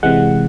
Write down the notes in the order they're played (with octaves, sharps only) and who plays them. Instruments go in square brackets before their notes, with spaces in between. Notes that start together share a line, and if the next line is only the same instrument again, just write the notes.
[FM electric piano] C3 E3 G#3 F#5